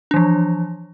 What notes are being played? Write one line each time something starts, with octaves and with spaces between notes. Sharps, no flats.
E3 F3 D4